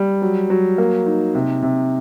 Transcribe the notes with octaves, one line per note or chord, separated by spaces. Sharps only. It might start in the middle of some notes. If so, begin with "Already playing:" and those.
Already playing: G3
F#3
F#3
A#3
D#4
C3
C3